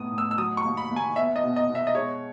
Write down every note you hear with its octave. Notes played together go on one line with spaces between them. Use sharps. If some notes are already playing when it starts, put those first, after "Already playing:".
Already playing: A2 B3 D#6
A2
E6
E6
F#3 D#6
C#6
D#2
B5
D#2
G#5
B3 E5
D#5
B2
D#5
B2
E5
D#5
G#3 C#5